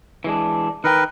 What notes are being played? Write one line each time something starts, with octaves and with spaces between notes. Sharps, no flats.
E3 G#3 D4
D#3 A#4 B4 G5